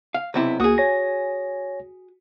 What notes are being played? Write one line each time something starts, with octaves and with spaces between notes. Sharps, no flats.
F5
B1 C3 E4
C2 A#3 F#4 G#4 D#6
C#5 G#5 A#6